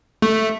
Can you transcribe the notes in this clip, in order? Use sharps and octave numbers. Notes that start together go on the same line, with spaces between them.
A3